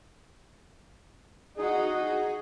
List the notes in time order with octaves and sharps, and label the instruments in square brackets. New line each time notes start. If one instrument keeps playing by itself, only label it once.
[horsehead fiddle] D#4 F#4 [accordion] G#4